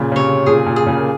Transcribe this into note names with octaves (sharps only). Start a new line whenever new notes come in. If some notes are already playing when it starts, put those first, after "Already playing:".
Already playing: A#2 C#3
C#3
C3 C#5
A#2 G#4
A#2
G#4
A#2 C#3
A#3